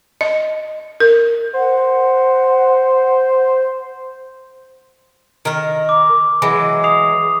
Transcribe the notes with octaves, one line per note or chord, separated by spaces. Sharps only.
D#5
A#4
C5 F#5
D#3 A#4
D6
E3 F#3 G#3
D#6 C7 F7